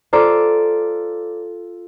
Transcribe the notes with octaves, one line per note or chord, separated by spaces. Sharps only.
F4 A4 C5 D5 A#5 D6